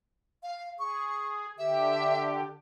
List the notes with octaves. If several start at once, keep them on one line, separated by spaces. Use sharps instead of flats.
F5
G#4 C#6
D3 G4 E5